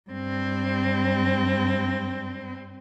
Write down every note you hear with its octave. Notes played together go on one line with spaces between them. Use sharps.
G2 C4